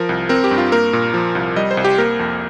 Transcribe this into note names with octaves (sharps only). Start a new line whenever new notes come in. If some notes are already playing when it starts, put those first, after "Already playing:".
Already playing: F3 A#4
C2
C4 A#4
G4
G2
F4
A#3 A#4
A#2
F3
C2
G3 D#5
C5
C2
G4
A#3 A#4
F2